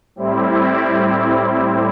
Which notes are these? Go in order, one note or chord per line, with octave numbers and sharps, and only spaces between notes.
A2 G3 C4 E4